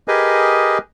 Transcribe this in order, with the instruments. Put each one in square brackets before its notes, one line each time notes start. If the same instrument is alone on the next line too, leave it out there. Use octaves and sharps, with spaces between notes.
[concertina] G4 G#4 A#4 B4 D#5 G#5